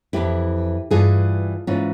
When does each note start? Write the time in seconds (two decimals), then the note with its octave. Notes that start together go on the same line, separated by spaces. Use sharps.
0.13 F2 E3 E4 G4
0.91 G2 E3 F4 G#4
1.67 G#2 E3 C#4 F4